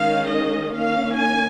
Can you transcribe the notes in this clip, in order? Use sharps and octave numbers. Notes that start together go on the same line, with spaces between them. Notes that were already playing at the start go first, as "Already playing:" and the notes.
Already playing: D#3 G#3 C#4 F5
D#5
D#3 A#3 C#4 F5
G#5